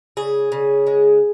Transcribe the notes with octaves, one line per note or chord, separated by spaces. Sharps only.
C#3 G#4
C#3
G#3